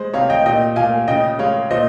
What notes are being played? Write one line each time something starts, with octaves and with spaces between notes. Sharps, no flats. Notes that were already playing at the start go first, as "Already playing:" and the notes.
Already playing: G#3 C5
C3 C#5 F5
D#5 G5
A#2 D#5 G5
A#2 F5 G#5
C#3 D#5 G5
G#3 C#5 F5
A#2 C5 D#5